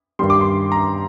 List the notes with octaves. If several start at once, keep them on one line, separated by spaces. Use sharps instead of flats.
G2 D#3 G3 C6
D6
C6
A#5